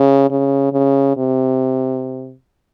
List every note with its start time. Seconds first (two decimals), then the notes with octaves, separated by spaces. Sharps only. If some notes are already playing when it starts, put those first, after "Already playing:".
Already playing: C#3
0.30 C#3
0.73 C#3
1.17 C3